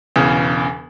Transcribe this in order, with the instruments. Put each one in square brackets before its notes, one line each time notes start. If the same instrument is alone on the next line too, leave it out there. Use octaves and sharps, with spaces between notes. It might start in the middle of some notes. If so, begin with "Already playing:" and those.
[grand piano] E1 E2 C#3